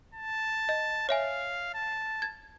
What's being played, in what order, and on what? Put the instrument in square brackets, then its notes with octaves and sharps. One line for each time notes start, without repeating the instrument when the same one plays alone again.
[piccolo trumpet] A5
[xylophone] D#5
[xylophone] C#5 E5 G#5 [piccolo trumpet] F5
[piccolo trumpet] A5
[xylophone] G#6